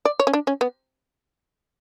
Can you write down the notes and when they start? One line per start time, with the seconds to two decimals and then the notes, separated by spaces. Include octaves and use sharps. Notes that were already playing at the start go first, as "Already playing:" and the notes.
0.05 D5
0.20 C#5
0.27 C#4
0.33 D4
0.47 C#4
0.61 B3